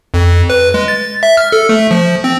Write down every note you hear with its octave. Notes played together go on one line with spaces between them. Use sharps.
F2
B4
G#3
A6
E5
F6
A4
A3
F3
C4